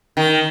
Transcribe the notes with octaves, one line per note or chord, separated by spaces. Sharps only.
D#3